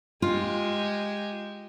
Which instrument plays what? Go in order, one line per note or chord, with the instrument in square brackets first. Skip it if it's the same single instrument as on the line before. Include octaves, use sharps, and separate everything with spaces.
[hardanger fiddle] G#3 G4 [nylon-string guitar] F4